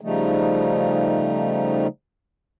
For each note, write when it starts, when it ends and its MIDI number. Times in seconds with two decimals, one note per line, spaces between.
0.01 1.87 49
0.01 1.87 53
0.01 1.87 55
0.01 1.87 57
0.01 1.87 63